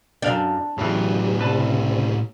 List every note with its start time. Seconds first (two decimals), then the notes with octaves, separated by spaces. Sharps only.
0.22 F#2 D4 F5 G5
0.78 A2 C#3 E3 F#3 G3 B3 G4
1.39 C2 C#3 C4 B4 A5